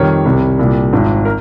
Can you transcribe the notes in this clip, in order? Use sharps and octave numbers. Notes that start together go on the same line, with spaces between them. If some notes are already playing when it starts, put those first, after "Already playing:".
Already playing: F2 D#3 G3 A#4 C#5
C2 C3 G3
C2 A#2 G3
G#1 G#2 F3
A#4